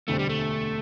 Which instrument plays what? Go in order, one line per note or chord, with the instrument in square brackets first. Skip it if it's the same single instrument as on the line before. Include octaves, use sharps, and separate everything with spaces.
[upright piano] E1 D2 D3 C4 G4 [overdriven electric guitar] A3
[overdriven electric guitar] G3
A3